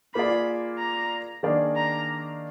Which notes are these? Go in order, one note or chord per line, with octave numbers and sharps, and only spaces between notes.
A#3 F4 G#4 D5 B5
A#5
D#3 A#3 D4 G#4 D5
A#5